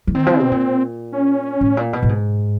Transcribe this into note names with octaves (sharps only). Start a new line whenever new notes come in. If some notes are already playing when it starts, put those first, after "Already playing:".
E3
D#3 C4
F3
B2
A#2
C#4
A2
A#2
B2
A2
G#2